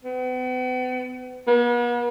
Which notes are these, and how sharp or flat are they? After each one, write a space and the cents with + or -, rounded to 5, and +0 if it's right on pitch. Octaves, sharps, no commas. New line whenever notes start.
B3 +40
B3 -45